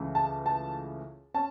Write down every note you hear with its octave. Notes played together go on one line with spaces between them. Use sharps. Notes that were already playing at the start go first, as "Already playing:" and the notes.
Already playing: C#2 C#3 E3 A3
A5
A5
C#4 A5